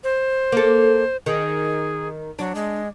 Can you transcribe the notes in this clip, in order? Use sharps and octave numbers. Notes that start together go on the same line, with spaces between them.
C5
A#3 A4
D#3 G#4
F#3 D4
G#3